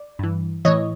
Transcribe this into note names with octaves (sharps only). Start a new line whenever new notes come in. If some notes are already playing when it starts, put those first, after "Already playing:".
Already playing: D5
G2 E3
A2 E3 C#5 D#5